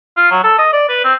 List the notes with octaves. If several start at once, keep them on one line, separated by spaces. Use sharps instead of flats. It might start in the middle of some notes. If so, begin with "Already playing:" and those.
F4
F#3
A4
D#5
D5
B4
C4